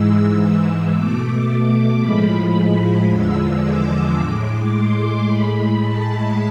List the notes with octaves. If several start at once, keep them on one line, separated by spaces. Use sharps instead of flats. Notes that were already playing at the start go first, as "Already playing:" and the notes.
Already playing: G#2 E3 G#3 E6
B2 A3 D6
A2 F3 G#3 B5
E2 D3 F3 G#3 E6
D6
A2 G#3
C6
A2 G#3 B5
A5